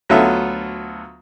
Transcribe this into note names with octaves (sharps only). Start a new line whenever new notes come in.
D2 F#3 B3 F4 A4 E5